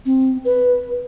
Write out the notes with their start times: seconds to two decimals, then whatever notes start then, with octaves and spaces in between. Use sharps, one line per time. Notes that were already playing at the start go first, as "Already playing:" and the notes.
0.06 C4
0.45 B4